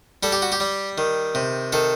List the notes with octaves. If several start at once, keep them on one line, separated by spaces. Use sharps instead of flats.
G3 A4
G4
F#4
G4
G3
D#3
C3
D#3 A4